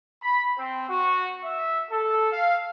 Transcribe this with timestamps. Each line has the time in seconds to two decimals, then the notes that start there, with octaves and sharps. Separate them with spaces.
0.22 B5
0.57 C4
0.90 F#4
1.44 E5
1.91 A4
2.33 F5